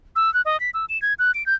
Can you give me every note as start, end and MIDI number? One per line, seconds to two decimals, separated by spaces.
0.16 0.33 88
0.34 0.42 90
0.45 0.59 75
0.60 0.70 95
0.74 0.85 88
0.89 1.00 100
1.02 1.14 92
1.19 1.32 90
1.34 1.46 98
1.46 1.54 91